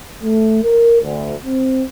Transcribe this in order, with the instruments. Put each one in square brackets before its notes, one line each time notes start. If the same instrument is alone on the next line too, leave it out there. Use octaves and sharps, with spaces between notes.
[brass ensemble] A3
A#4
D2
C4